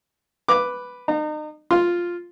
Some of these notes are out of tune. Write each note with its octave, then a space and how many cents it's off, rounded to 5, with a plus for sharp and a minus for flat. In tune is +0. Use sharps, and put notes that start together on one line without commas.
B4 +0 D6 +0
D#4 -35 A#5 -35
F4 +0 C6 +0